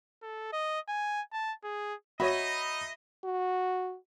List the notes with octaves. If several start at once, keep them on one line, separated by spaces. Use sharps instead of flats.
A4
D#5
G#5
A5
G#4
D#4 F#4 C#5 D#5 E5 B5
F#4